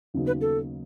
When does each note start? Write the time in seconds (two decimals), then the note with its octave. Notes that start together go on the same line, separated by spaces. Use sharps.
0.14 D#2 C#3 F#3 B3 D#4
0.27 B4
0.41 A4